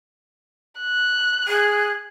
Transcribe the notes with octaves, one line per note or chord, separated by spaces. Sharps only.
F#6
G#4